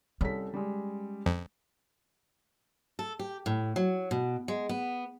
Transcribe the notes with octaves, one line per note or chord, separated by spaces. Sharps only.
C2 C#4 A4 B6
G3 G#3
F2
A4
G4
A2
F#3
B2
G#3
B3